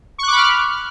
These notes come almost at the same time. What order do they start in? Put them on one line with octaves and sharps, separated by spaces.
C#6 F#6 D6 B5 F6